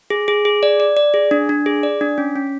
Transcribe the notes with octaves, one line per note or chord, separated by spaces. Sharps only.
G#4
G#4
G#4
D5
D5
D5
G#4
D4
D4
G#4
D5
D4
C#4
C#4